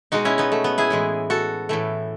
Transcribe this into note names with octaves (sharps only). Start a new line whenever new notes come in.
B2 G#3 D#4 F#4
C#4 E4
B3 D#4
A3
B3
E4 G#4
A2 E3 G#3
F#4 A4
A2 E3 A3